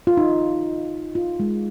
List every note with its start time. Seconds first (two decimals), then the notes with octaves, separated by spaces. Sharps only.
0.07 F4
0.17 D#4
1.15 F4
1.40 G#3